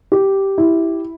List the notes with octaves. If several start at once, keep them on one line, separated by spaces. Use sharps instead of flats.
G4
E4